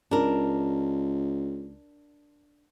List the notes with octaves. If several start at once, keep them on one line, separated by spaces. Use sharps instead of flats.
C#2 D4 A#4